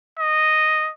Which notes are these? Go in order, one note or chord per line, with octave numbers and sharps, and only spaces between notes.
D#5